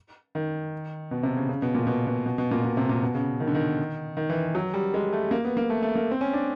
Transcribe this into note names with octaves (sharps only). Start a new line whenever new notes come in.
D#3
B2
C3
C#3
C#3
B2
A#2
B2
B2
B2
B2
A#2
B2
C3
A#2
B2
C#3
D#3
D3
D#3
D#3
E3
F#3
G3
G#3
A3
A#3
B3
A#3
A3
A3
A#3
C4
C#4
D4